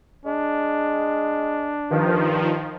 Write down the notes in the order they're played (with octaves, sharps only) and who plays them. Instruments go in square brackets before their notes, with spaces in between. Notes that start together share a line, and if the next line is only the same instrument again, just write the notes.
[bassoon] G#3 [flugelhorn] D4
[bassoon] G2 [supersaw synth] D#3 F3